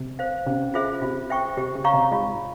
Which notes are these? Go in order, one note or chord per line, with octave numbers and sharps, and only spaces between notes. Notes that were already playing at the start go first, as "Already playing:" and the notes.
Already playing: C3
C5 F5
C3 C#4
F4 G#4 C5 E5
C3 F4
C5 E5 G5 C#6
C3 G4
C#3
C#5 F5 A#5 C#6
C3
G#2 F4